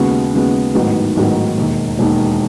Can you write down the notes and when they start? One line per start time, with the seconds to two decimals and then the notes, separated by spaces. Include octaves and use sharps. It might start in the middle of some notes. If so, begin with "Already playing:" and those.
Already playing: D#2 C#3 G#3 B3 F#4
0.33 D#2 C#3 G#3 B3 F#4
0.75 A1 G#2 D#3 F#3 B3
1.16 A1 G#2 D#3 F#3 B3
1.58 E1 D#2 D#3
1.99 E1 D#2 D#3